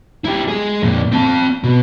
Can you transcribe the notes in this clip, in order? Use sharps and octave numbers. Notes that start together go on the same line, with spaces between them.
E4 G4
G#3 G#4
F2 A#2
C4 A5
B2